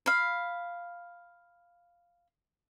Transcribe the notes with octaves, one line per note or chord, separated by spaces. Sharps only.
F5 B5